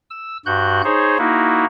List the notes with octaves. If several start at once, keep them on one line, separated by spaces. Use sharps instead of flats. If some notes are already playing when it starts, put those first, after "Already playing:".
E6
G2 F#4 F#6 G6
D#4 G#4 C5 C#5
A#3 D#4 E4 F#4